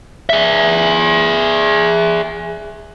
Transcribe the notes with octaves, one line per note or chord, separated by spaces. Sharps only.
G#4 E5